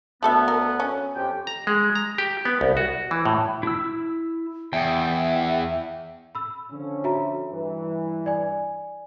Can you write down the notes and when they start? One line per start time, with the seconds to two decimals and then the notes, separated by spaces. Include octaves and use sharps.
0.23 D2 A3 B3 A4 E5
0.48 A#4
0.80 C#4
1.16 F2 G4 G5
1.47 A#5
1.67 G#3
1.95 A#5
2.18 G4
2.45 B3
2.61 C2
2.77 F#4
3.11 E3
3.26 A2
3.63 E4 E6
4.73 E2 E5 G5
6.35 B5 E6
6.71 D3 F3 C#4
7.04 F#4 E5 A#5
7.51 G2 E3
8.26 D5 G#5